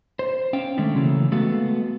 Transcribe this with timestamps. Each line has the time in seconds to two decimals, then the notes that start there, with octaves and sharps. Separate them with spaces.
0.19 C5
0.53 C#4 F5 G5
0.77 D#3 G#3 A3 C#4 D4
0.95 C#3 E3 F#3 A3 A#3
1.32 G#3 A3 B3 F#4 A4 F5